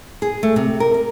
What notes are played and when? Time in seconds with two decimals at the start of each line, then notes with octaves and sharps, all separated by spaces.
0.22 G#4
0.43 A3
0.56 C3
0.80 A#4
0.94 A#4